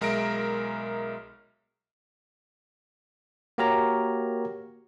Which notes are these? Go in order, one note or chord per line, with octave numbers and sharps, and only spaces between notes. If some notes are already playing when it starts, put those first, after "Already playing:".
B1 G#3 A#4 E5 A#6 D7
A#3 F#4 G4 A#4 C#5 A#5